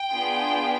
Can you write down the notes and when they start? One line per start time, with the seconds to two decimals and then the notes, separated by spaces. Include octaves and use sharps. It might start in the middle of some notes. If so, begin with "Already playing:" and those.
Already playing: G5
0.11 B3 D4 F4 G#4